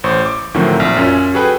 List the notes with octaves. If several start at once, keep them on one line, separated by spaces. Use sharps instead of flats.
A1 C5 C#6
D6
D2 A2 D#3 F3 F#3 C4
A#1 F6
F#2 C#4 F4
F#4 G#4 A4 B4 G5